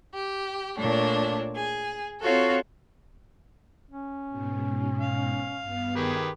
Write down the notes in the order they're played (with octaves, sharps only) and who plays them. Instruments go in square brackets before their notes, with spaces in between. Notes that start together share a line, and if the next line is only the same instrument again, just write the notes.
[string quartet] G4
A#2 A3 D4 C#5
G#4
C4 F4 F#4 A4 C#5
[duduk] C#4
[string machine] G#2 B2
[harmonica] F5
[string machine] G2 B3
[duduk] D#3 [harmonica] G4 G#4 B4